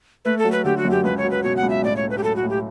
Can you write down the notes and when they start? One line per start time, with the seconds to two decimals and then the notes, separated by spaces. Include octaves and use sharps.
0.25 A3 B4
0.39 A4
0.45 F#3
0.52 B4
0.65 D3 G4
0.77 F#4
0.85 F#2
0.91 G4
1.04 C#2 B4
1.18 C#5
1.24 F#3
1.31 B4
1.43 B2 C#5
1.56 F#5
1.63 C#2
1.70 E5
1.84 A2 D5
1.97 C#5
2.04 A3
2.10 B4
2.18 G4
2.23 F#3 A4
2.36 F#4
2.43 A2
2.50 G4